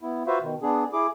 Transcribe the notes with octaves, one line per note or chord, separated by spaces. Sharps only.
B3 E4
F4 F#4 B4 C5 E5 F5
B2 D#3
B3 D4 G#4
E4 G#4 D6